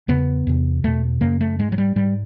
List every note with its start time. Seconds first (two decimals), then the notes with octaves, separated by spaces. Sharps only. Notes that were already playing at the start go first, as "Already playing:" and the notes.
0.08 E2 C#3 B3
0.47 E2 C3
0.84 E2 B2 A3
1.21 F#2 C#3 A#3
1.41 A3
1.59 G#2 G#3
1.72 F#3
1.78 G3
1.96 G#2 G3